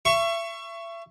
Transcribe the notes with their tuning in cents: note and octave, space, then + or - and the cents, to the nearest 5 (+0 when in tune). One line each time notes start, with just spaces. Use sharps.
E5 +35 C#6 +0